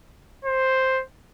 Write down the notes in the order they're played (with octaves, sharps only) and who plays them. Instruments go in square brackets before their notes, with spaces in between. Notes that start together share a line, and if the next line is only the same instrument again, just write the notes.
[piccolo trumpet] C5